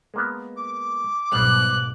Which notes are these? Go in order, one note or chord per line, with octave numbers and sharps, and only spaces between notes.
G#3 A#3 B3
D6
B1 G#2 G3 B3 C5 F#6